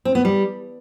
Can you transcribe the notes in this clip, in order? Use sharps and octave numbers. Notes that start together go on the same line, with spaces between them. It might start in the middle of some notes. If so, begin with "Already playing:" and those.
C4
B3
G3